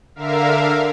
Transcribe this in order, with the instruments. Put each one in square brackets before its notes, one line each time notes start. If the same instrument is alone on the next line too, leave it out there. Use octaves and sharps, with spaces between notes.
[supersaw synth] D3 A#4 E5 F5